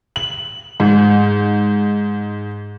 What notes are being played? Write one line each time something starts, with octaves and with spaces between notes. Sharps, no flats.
F#7
G#2